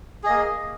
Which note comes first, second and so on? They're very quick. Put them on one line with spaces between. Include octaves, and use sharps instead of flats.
G#4 D#5 A#3